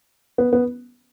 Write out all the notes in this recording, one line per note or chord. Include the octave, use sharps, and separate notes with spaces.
B3
B3